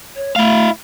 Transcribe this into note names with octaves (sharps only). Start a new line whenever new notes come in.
C#5
A3 E4 F5